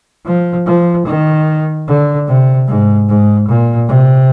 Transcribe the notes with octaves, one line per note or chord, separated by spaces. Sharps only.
F3
F3
D#3
D3
C3
G#2
G#2
A#2
C3